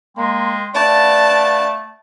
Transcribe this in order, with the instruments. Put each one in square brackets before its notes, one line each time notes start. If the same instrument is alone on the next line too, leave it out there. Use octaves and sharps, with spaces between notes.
[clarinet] G#3 [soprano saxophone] A#3 [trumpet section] G5 C6
[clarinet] A3 [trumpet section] F#4 B4 F5 [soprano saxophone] D5 [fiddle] A5